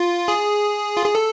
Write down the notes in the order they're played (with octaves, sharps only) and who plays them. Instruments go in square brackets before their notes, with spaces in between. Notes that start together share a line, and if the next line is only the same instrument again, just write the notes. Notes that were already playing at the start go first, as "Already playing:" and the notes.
Already playing: [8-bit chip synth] F4
G#4
F4
G#4
A4